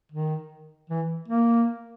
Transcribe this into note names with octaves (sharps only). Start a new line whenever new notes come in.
D#3
E3
A#3